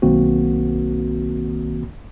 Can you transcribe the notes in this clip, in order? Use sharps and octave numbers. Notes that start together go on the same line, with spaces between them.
B1 D#3 A#3 C4 F#4